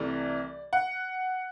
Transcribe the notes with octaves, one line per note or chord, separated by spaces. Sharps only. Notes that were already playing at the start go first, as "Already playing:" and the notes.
Already playing: C2 C3 E3 A3 D5
F#5